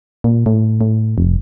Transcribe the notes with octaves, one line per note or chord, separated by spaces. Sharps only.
A#2
A2
A2
F1